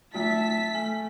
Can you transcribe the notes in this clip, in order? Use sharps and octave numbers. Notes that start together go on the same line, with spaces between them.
F#3 A3 F4 E5 A5 B6
A3 G#5